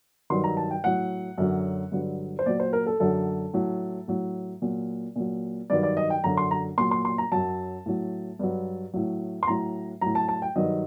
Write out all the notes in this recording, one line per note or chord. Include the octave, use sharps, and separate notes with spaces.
G2 D#3 F#3 C6
A#5
A5
G5
A2 F#3 F#5
F#2 D3 F#3
G2 D3 F#3
C5
A#2 F#3 D5
C5
A#4
A4
F#2 D3 F#3 A4
A2 F#3
A2 F#3
A#2 F#3
A#2 F#3
G2 D#3 F#3 D5
D5
D#5
G5
F#2 D3 F#3 A#5
C6
A#5
A#2 F#3 C6
C6
C6
A#5
F#2 F#3 A5
A2 F#3
G2 F#3
A2 F#3
C6
A2 F#3 A#5
A2 F#3 A#5
A5
A5
G5
G2 D#3 F#3 D#5